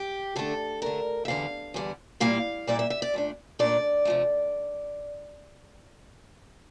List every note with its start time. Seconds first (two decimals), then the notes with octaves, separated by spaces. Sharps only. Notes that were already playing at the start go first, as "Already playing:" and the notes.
Already playing: G4
0.36 D3 A3 D4 A4
0.82 D3 A3 D4 A#4
1.25 E5
1.28 E2 D3 G3 F5
1.74 E2 D3 G3
2.20 A#2 G3 A#3 E4 F5
2.67 A#2 G3 A#3 E4 D5
2.79 E5
2.90 E5
3.02 D5
3.14 A#2 A3 D4
3.59 A#2 A3 D4 D5
4.05 C3 F3 A3